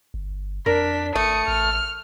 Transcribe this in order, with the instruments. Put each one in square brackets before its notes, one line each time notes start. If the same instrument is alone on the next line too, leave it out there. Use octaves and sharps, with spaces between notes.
[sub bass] G1
[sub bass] F2 [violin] D4 B6 [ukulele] A#4
[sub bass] G#1 [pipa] A3 [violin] D#6 C#7
[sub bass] A1 [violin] F6